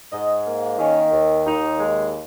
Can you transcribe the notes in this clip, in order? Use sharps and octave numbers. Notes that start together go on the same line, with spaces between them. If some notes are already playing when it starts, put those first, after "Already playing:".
G#2 D#5
A#3
D#3 C#4
D#2
D#2 D#4
G#3